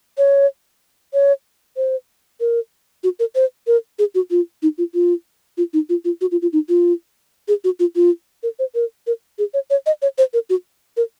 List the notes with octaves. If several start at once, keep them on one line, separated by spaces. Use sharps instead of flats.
C#5
C#5
C5
A#4
F#4
A#4
C5
A#4
G#4
F#4
F4
D#4
F4
F4
F4
D#4
F4
F4
F#4
F4
F4
D#4
F4
G#4
F#4
F4
F4
A#4
C5
A#4
A#4
G#4
C#5
C#5
D#5
C#5
C5
A#4
F#4
A#4